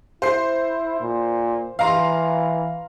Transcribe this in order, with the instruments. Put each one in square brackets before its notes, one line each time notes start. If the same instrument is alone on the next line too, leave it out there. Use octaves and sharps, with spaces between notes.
[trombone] E4 [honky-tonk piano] C5 C7
[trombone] A#2
[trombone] E3 [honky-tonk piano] F5 A#5 C6